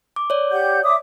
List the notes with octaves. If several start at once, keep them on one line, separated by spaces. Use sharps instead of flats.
D6
C#5 D5
G4 F#5 G6
E5 D6 D#6